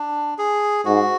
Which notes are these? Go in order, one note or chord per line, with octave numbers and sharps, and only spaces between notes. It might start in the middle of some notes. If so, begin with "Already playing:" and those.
Already playing: D4
G#4
G#2 F#4